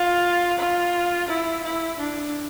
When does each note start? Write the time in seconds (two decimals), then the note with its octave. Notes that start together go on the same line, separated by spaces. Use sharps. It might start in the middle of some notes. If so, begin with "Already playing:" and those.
Already playing: F4
0.59 F4
1.28 E4
1.64 E4
1.99 D4